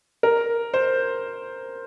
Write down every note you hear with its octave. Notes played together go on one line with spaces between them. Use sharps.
A#4
C5